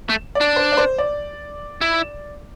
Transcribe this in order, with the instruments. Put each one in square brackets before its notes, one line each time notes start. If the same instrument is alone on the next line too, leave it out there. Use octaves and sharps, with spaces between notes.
[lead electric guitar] A3
[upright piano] D5
[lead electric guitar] D4
[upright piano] C5
D5
C5
D5
[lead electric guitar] E4